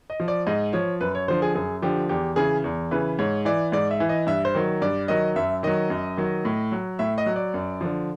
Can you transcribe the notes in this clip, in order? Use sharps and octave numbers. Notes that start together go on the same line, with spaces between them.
D#5
F3
D5
G#2 D#5
F3 C#5
F#2 B4
C#5
D3 F3 C5
G#4
F#2 G#4
D3 F3 G4
E2 G4
C#3 E3 G#4
E2
C#3 E3 B4
G#2 C#5
E3 D5
G#2 D5
E5
E3
D#5
G2 E5
C5
D#3 F#3
G2 D5
D#3 F#3 D#5
F#2 E5
D#3 F#3 D#5
F#2
D#3 F#3
A2
F#3
A2 E5
D#5
F#3
D5
F#2
D3 F3